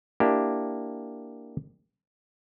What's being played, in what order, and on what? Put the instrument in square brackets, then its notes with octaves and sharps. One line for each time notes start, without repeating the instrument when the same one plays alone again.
[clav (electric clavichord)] A#3 D4 E4 G4